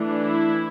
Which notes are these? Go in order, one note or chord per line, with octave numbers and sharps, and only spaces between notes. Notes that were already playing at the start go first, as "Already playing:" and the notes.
Already playing: E3 A3 D4
E4